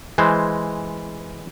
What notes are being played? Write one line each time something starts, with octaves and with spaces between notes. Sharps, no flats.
E3 G#3 C5